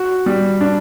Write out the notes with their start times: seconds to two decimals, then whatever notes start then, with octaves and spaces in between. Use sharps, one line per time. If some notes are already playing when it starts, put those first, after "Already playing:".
Already playing: F#4
0.26 G3
0.61 D4